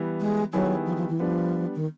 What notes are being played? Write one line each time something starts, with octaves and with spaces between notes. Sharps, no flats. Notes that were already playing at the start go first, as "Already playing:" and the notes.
Already playing: E3 G3 B3
G#3
D#3 F#3 G3 B3 E4 G#4
F3
F3
E3
F3 G3 B3 D4
D#3